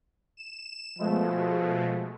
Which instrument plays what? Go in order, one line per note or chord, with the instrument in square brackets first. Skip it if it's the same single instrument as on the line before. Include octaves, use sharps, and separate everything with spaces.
[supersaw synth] E7
[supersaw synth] B2 G#3 A3 [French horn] F3